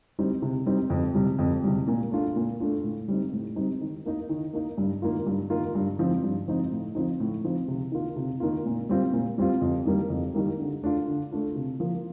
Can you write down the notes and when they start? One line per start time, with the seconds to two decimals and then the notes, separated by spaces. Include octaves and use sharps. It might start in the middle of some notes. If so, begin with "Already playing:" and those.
0.19 G3 C4 D#4
0.42 C3
0.66 G3 C4 D#4
0.90 F2
1.14 C3 G3
1.39 F2
1.64 C3 G3
1.87 A#2
2.11 A3 D4 F4
2.36 A#2
2.60 A3 D4 F4
2.84 A2
3.08 G3 C4 D#4
3.32 A2
3.56 G3 C4 D#4
3.81 D#3
4.05 A#3 D#4
4.29 D#3
4.53 A#3 D#4
4.78 G2
5.02 D#3 A#3 F4
5.26 G2
5.50 D#3 A#3 F4
5.75 G2
5.99 F3 C4 D#4
6.24 G2
6.48 F3 C4 D#4
6.72 A2
6.95 F3 C4 D#4
7.20 A2
7.44 F3 C4 D#4
7.68 C3
7.92 D#3 A#3 F4
8.16 C3
8.40 D#3 A#3 F4
8.65 A#2
8.89 G3 C4 F4
9.13 A#2
9.38 G3 C4 F4
9.61 F2
9.85 D#3 G3 A#3
10.10 F2
10.34 D#3 G3 A#3
10.59 D3
10.82 A3 D4 F4
11.08 D3
11.31 A3 D4 F4
11.55 C3
11.80 F3 A#3